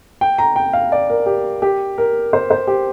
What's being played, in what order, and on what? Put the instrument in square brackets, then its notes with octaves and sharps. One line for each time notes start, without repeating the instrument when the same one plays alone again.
[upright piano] G5
A#5
G5
F5
D5
A#4
G4
G4
A#4
C5
C5
G4